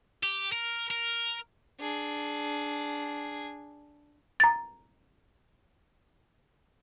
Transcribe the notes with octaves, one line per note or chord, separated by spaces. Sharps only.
G4
A#4
A#4
D4 G#4
A#5 A6